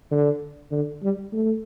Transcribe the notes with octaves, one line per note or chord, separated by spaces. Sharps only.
D3
D3
G3
A3